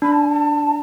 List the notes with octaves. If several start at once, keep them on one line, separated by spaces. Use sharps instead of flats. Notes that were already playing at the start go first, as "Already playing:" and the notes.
D4 B5
A5
G#5
A5